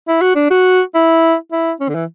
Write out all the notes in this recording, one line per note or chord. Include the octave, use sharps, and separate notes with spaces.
E4
F#4
D4
F#4
E4
E4
C#4
D3
E3